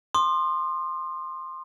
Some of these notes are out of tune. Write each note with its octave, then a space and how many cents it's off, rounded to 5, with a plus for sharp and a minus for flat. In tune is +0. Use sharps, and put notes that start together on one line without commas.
C6 +10 D#6 -45